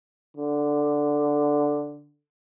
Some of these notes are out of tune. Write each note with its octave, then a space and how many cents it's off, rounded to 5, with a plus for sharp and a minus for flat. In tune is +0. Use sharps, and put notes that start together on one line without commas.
D3 +0